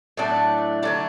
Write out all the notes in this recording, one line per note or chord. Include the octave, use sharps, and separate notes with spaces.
A2 F#3 A3 D4
D3 F#3 A3 D4